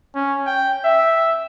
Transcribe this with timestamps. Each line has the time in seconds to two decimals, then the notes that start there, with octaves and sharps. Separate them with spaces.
0.15 C#4
0.47 G5
0.85 E5